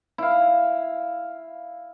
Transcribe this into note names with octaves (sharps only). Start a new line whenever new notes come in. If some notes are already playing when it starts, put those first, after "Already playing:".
E4 F5